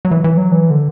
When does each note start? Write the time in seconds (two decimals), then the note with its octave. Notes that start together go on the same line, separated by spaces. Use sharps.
0.05 F#3
0.11 E3
0.24 E3
0.37 F#3
0.52 E3
0.70 D3